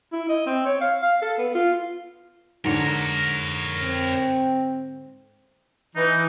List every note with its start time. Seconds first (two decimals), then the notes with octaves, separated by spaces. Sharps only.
0.12 E4
0.29 D#5
0.46 C4
0.66 C#5
0.81 F5
1.02 F5
1.22 A4
1.38 B3
1.54 F4
2.65 G#2 D3 A#4 C#5
3.81 C4
5.96 E3 D#4